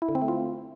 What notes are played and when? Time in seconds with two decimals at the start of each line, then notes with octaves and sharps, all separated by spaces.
0.02 E4
0.08 D3
0.15 C4
0.22 A3
0.28 F4